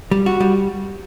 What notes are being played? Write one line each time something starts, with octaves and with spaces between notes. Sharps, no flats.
G3
F#4
G3